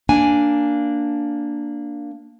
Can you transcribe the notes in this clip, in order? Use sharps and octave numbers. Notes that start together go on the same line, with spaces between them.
A#3 D4 G#5